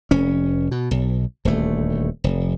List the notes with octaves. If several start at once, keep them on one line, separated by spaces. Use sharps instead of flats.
F1 C#4
B2
B1
D#1 D2 A3
F1